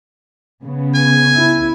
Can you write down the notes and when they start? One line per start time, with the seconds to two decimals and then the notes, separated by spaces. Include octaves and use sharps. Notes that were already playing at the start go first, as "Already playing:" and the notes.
0.64 C#3 B3
0.95 G#5
1.35 E4